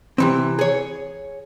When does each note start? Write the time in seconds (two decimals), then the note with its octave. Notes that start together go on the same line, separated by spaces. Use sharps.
0.18 C3 E3 C4
0.59 G#4 C#5